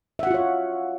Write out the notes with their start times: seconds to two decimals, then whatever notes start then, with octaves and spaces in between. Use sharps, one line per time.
0.19 E5
0.23 F#5
0.27 F#4
0.31 F4
0.34 C#5